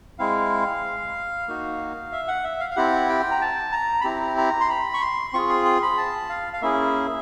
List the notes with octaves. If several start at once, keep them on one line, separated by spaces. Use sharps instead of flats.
G#3 C4 E4 F5
A#3 D#4 F#4
E5
F#5
E5
F5
F5
C4 E4 G4 F#5
G5
A#5
A5
A#5
B5
C4 E4 G4 A#5
A#5
C6
B5
C#6
C6
C4 F4 G#4 C#6
C6
C6
B5
A5
F5
F5
A#3 C#4 E4 G#4 E5